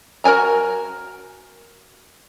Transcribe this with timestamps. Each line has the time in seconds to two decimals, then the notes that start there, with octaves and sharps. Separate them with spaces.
0.24 F#4 A#4 C#5 G#5 A#5